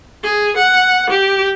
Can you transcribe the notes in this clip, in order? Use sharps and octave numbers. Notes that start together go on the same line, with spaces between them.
G#4
F#5
G4